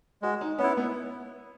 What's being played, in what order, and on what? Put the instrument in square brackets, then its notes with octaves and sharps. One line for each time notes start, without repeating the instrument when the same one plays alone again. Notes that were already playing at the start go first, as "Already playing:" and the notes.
[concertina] G#3 [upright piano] F#4
[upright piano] D#4
[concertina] B3 E4 [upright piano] C#4
[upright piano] B3